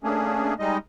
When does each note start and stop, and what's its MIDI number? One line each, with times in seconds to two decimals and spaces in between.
0.03 0.54 57
0.03 0.54 58
0.03 0.54 61
0.03 0.54 62
0.03 0.54 68
0.59 0.78 55
0.59 0.78 56
0.59 0.78 63
0.59 0.78 75